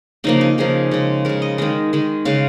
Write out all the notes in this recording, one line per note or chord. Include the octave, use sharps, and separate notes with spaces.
C#3 F3 A#3 D#4
D#4
C#3 F3 A#3 G#4
C#3 G#3
C#3 G#3 A#4
D#5
D#3 G#3 D#5
D#3 G#3
C#3 G#3 F5